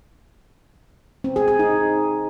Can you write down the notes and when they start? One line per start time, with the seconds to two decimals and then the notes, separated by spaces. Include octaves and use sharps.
1.24 C4
1.36 G#4
1.48 G#4
1.59 D#4